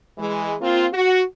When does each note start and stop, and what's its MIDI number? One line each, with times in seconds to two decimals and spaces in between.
0.18 0.56 52
0.18 0.56 56
0.62 0.88 58
0.62 0.88 60
0.62 0.88 65
0.93 1.22 66